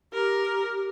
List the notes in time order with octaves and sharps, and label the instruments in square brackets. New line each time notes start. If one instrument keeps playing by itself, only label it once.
[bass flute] G4 [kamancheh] A#4